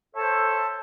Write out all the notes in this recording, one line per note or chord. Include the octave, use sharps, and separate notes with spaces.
A4 C5 C#5 E5 A5